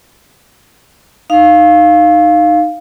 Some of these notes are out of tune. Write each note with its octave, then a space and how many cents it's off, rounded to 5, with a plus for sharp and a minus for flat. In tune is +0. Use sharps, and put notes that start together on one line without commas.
D#4 -10 F5 +0